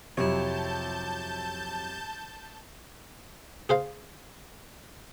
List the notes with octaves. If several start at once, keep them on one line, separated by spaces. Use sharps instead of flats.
F2 C3 F#3 E4 F4 C#5 A5 G6
G#4 C5 F5